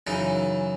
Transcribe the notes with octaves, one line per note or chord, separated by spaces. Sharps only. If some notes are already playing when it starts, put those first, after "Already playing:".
F#2 C#3 E3 D#4